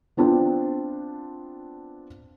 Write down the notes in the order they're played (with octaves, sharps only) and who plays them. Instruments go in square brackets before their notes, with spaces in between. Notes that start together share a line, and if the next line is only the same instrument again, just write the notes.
[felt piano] B3 C4 D4 F4